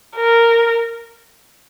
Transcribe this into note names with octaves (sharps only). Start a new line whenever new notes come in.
A#4